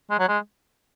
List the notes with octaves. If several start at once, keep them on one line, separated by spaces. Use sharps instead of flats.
G#3
F#3
G#3